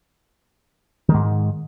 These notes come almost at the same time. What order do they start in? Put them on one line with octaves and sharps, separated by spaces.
D#3 G#3 G#2